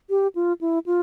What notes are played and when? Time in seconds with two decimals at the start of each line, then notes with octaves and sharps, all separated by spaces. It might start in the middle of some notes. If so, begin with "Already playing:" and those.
0.10 G4
0.35 F4
0.61 E4
0.86 F4